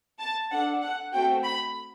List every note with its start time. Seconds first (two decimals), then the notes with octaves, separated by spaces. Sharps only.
0.20 A5
0.51 D4 A4 F#5
0.82 F#5
1.12 A3 C4 F#4 G5
1.43 B5